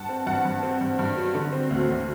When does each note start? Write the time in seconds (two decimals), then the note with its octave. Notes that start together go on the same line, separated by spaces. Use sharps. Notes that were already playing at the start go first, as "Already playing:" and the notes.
Already playing: G2 F#5 A5
0.09 C4
0.26 G2 F#5 A5
0.45 G2
0.63 C4
0.81 G2
0.99 G2
1.16 F#3
1.34 D3
1.52 C4
1.70 D2
1.88 D2